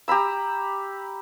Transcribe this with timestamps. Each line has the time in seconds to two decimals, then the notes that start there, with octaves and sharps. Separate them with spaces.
0.08 G4 A#5 B5 E6